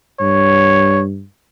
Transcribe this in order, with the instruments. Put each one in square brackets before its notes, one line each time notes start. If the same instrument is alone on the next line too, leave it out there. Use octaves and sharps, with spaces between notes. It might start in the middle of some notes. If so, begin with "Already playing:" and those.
[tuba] G2 [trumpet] C#5